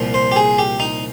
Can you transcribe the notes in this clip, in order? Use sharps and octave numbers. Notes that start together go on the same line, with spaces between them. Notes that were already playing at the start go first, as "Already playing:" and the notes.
Already playing: C2 A#2 F3
C5
G4
G#4
G4
D#4